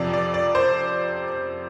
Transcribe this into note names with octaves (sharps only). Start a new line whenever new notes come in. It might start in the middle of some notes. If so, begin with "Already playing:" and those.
Already playing: F2 C3 F3 D5
D5
D5
C5